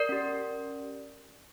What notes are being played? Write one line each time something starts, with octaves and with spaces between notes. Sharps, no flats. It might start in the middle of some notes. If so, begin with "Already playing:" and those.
Already playing: A#4 D5
C#4 G4